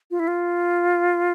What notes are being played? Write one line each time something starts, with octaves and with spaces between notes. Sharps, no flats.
F4
E4
F4